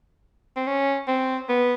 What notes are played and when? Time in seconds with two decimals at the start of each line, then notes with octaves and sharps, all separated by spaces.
0.56 C4
0.67 C#4
1.08 C4
1.49 B3